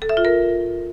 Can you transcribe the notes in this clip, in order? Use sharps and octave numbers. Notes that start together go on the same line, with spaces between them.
A4
E5
F4
A#4